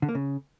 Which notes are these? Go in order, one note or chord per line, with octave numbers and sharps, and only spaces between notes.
D3
A#3
C#3